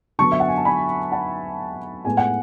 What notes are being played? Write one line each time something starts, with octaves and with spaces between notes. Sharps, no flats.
D3 F#3 B3 A5 C#6
E5
F#5
G#5
A5
G#5 B5
F#5 A5
A2 G#3 B3 G#5
F#5